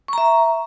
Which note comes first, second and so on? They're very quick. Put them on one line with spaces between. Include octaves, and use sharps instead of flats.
C#6 A#5 E5